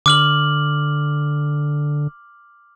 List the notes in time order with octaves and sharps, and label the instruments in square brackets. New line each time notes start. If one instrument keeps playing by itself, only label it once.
[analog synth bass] D3 [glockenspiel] D6 F6 F#7